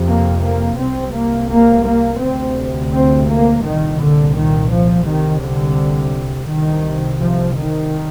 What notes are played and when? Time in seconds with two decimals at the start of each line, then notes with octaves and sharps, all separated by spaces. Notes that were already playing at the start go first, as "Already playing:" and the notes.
Already playing: F2 C3
0.09 A#3
0.45 A#3
0.80 C2 C3 C4
1.15 A#3
1.51 A#3
1.87 A#3
2.22 D2 C3 C4
2.93 C4
3.29 A#3
3.64 C2 A#2 D#3
4.00 D3
4.35 D#3
4.71 F3
5.06 C2 C3 D#3
5.42 D3
6.48 C2 C3 D#3
7.19 F3
7.54 D#3